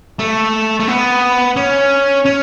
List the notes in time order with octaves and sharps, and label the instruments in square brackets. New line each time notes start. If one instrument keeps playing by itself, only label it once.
[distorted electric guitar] A3
A3
B3
C#4
C#4